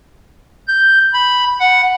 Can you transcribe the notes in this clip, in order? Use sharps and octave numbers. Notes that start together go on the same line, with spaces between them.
G6
B5
F#5